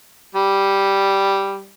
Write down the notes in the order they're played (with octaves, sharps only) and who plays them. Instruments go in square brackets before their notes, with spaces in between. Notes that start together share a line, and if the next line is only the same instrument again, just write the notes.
[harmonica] G3